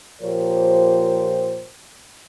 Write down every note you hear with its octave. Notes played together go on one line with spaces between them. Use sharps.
A#2 F3 G4 A#4 C5 C#5